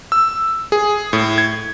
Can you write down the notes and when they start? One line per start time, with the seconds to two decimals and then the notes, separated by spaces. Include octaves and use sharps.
0.12 E6
0.72 G#4
1.13 A2
1.38 G#6